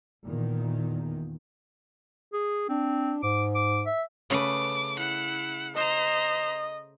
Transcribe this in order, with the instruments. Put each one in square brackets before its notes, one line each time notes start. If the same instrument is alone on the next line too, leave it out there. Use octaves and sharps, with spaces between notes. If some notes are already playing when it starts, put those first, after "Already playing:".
[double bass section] E2 A#2 D#3
[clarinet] G#4
[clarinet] C4 [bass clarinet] D4
[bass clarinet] G#2 [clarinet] D6
[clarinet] D6
E5
[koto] C#3 A3 B4 [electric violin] D6
[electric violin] E4 F#5
[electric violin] C5 A#5 [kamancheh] D#5